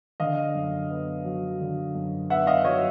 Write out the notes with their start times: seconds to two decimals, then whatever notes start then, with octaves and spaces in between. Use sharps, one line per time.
0.20 D3 D#5 F5
0.55 F#2
0.91 B3
1.25 F#3
1.60 D3
1.95 F#2
2.30 B3 E5 F#5
2.47 D#5 F5
2.65 F#3 C#5 D#5